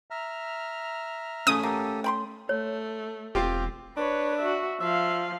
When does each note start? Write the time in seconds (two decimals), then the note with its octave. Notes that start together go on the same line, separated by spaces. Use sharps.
0.11 E5 A#5 F6
1.47 C#3 A3 C#4 D#6
1.63 A#3 G4 A4
2.04 G5 B5 C6
2.49 A3 C#5
3.35 E1 C4 F4 G4
3.97 D4 B4 C#5
4.39 F#4 E5
4.80 F3 E5 F5